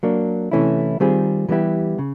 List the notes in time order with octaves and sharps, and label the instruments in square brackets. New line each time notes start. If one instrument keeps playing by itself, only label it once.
[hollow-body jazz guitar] F#3 A#3 D4
C3 E3 A3 C#4 E4
D#3 G3 C4 F4 G#4
E3 G3 B3 E4 G4
C#3